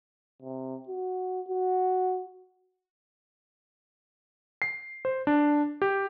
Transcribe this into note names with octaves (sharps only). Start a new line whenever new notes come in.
C3
F#4
F#4
C7
C5
D4
G4